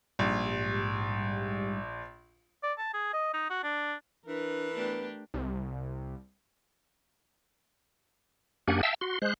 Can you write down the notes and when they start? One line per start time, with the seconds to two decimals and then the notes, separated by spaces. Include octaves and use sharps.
0.19 A#1 G#2 G3
2.63 D5
2.78 A5
2.94 G#4
3.13 D#5
3.34 D#4
3.50 F#4
3.64 D4
4.26 E3 D4 A#4 B4
4.74 A3 B3 D4 G4
5.34 C2
8.68 F#2 A#3 D4 G4 F#5 G#5
8.83 E5 F5 G5 A5 E6
9.01 F#4 C6
9.22 G#3 C5 F#6